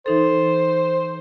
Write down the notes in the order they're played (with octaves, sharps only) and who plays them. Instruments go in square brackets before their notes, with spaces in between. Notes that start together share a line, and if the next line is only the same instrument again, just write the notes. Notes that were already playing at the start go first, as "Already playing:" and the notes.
[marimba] E3 D#4 A4 [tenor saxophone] C5